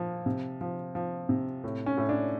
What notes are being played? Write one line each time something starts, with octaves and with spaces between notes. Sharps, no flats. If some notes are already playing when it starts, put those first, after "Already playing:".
Already playing: A#2 F3
C3
F3
F3
C3
A2
C#4
A2
D4